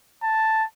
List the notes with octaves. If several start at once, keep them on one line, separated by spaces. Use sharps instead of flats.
A5